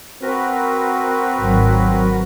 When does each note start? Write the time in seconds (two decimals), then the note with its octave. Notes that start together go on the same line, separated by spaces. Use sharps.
0.22 C4 F#4 A#4 B4
1.39 G#1 F#3